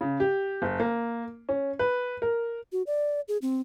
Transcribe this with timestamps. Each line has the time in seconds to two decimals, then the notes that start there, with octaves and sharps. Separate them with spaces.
0.01 C#3
0.20 G4
0.62 F#1
0.80 A#3
1.49 C#4
1.79 B4
2.22 A#4
2.72 F#4
2.87 D5
3.28 G#4
3.42 C4